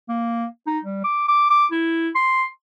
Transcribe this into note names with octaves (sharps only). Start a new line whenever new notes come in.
A#3
D#4
G3
D6
D6
D6
E4
C6